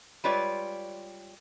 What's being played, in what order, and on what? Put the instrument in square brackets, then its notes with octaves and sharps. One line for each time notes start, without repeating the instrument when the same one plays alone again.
[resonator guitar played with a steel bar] G3 G#3 F4 B4 C#5 D5